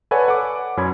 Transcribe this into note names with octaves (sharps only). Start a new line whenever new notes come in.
A4 B4 C#5 D5 F#5 G#5
F#5 D6
F#2 C#4 B5 G#6